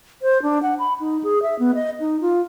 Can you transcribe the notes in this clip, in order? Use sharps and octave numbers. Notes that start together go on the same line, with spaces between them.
C5
D4
F#5
B5
D#4
G#4
E5
B3
D#5
D#4
F4